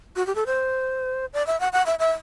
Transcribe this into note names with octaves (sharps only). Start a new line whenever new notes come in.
F#4
G4
A4
C5
D5
E5
F#5
F#5
E5
E5